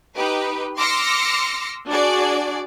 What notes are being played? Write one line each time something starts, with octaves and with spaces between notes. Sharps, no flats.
D#4 G4 B4
C6 D6 E6 F6 A#6 C#7
D4 F#4 G#4 D5